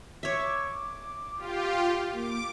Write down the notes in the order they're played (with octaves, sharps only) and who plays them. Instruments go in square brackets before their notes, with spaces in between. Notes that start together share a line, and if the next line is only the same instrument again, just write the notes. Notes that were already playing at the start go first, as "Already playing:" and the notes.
[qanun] C#5 E5 [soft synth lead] D6
[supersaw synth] F4 G4
[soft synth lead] A#3 [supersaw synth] D6